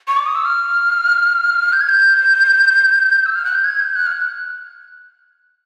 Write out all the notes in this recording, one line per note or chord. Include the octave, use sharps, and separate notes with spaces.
C#6
D6
D#6
E6
F6
G6
G#6
G6
E6
F6
F#6
G6
G#6
G6
F#6
F6
F#6